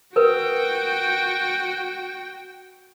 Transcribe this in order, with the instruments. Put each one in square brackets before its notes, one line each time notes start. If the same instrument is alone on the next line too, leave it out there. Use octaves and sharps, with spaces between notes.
[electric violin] F#4 G5 [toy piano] A#4 B4